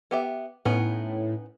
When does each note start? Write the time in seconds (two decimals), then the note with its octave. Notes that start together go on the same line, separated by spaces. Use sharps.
0.11 B3 G4 E5
0.65 A2 B3 C#4 D#4